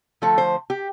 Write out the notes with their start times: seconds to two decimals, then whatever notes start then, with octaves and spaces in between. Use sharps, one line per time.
0.22 D3 F3 A3 A4
0.38 C5
0.70 G4